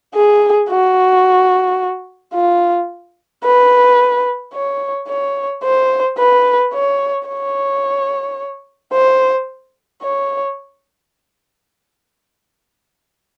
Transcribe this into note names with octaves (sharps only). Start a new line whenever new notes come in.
G#4
F#4
F4
B4
C#5
C#5
C5
B4
C#5
C#5
C5
C#5